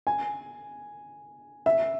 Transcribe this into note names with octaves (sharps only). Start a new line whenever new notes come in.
G#5
E5